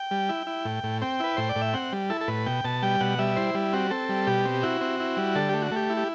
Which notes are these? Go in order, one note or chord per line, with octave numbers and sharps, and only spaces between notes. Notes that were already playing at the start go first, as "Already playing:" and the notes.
Already playing: G5
G3
E4
E4
A2
A2
C4 G5
E4 B4
A2 C5
D5
A2
E5
C4 F#5
G3
E4 A4
A4
A2 B4
B2 G5
B2 A5
G3 G5
B2 F#5
G3 E5
E4 C5
G3
C4 F#4
C4 A4
G3
B2 G4
C4
E4 F#4
C4
E4
G3
D3 A4
A3 G4
F#4
A3 G4
E4
G4